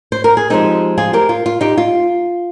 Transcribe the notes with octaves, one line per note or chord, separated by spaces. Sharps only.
C5
A#4
G#4
F3 G#3 C4 D#4 G4
F4 G#4
G4 A#4
F4
F4
D#4 G4
F4